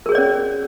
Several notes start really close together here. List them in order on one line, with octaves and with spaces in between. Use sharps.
A#4 G#4 C#5 D5 C#4